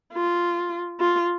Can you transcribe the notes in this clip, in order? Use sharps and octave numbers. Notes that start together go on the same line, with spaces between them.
F4
F4